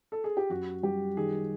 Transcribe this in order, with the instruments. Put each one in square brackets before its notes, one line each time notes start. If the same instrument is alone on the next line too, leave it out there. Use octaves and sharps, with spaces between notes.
[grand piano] A4
G#4
G4
[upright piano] F#2 [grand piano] F#4
[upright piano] G3 [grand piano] G4
[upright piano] D#3 [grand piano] G#4